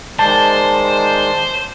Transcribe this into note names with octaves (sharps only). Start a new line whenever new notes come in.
D#3 G#3 C5 D5 A5